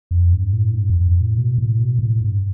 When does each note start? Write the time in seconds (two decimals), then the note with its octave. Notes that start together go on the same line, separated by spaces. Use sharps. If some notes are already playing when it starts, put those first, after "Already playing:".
0.11 F2
0.33 G2
0.53 A2
0.74 G2
0.90 F2
1.06 F2
1.20 A2
1.37 B2
1.58 A2
1.79 B2
1.99 A2
2.20 G2